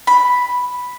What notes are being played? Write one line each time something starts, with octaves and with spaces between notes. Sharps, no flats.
B5